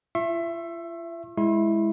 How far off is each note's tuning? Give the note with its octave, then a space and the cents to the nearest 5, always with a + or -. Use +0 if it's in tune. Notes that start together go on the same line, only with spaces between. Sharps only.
F4 -40 E5 +20 C#6 -45
G#3 +0 E4 +0 C6 +35